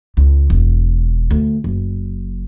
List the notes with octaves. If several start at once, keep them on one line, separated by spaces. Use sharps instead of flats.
C#2
E1
D2
F#1